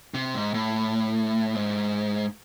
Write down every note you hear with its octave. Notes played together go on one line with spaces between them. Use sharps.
C3
G#2
A2
G#2